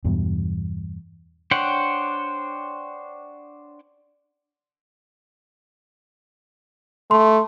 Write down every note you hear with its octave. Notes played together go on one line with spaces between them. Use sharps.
E2 G2 B2
D4 C5 C#5 F#5 G5
A3 C6